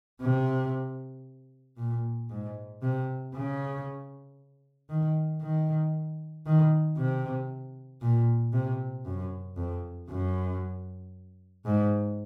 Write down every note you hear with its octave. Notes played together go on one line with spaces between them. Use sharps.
C3
A#2
G#2
C3
C#3
D#3
D#3
D#3
C3
A#2
C3
F#2
F2
F#2
G#2